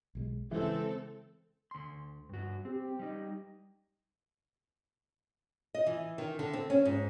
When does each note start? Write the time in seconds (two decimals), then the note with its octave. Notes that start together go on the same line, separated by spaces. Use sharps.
0.15 B1 G3 G#3
0.51 C#3 E3 G#3 C4 A4
1.71 D2 C6
2.29 G2 F#4
2.65 C4 G4
2.99 G3 D#4
5.75 D#5
5.87 E3
6.18 D#3
6.39 D3
6.53 C4
6.70 C#4
6.85 G#2